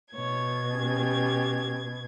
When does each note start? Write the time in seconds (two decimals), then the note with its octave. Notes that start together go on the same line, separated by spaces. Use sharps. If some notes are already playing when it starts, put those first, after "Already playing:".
0.15 B2 C#5 G#6
0.73 C#4 G4